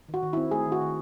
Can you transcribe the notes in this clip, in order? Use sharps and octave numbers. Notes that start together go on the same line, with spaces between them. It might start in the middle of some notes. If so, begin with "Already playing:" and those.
D#3
F#4
D#3
E4
C4
A3 G#4
D#3
F#4
D#3